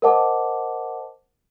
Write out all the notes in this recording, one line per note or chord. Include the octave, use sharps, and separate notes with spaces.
A#4 C5 D#5 F#5 A5 D6